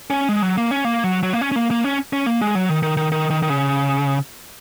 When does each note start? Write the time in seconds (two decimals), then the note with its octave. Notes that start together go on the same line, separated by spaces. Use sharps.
0.10 C#4
0.29 G#3
0.42 F#3
0.57 A#3
0.71 C#4
0.85 A#3
1.04 F#3
1.23 F#3
1.33 A#3
1.41 C#4
1.52 C#4
1.56 A#3
1.71 A#3
1.84 C#4
2.13 C#4
2.26 A#3
2.41 G#3
2.55 F#3
2.69 D#3
2.83 D#3
2.97 D#3
3.12 D#3
3.30 D#3
3.42 D#3
3.50 C#3